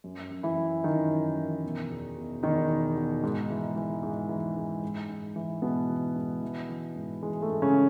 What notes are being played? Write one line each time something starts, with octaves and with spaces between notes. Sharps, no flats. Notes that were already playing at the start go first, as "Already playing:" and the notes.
F#2
F#2
E3 E4
F#2
F#2 D#3 D#4
F#2
E3
B2
E2
B2
E2 D#3 D#4
B2
B2
G#2
E3
E3
G#2
E3
G#2
G#2
G#2
E3
G#2 B2 B3
E3
G#2
E3
E3
G#2
E3 G#3
A3
G#2
C#3 C#4